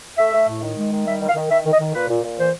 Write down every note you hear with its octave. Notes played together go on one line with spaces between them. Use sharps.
A3 E5
A3
A2
D#3
G#3
D#3
G3 E5
D#3
F5
D#3
D#3 E5
D#3
D#5
D#3
A#2 B4
A#2
A#2
E3 C5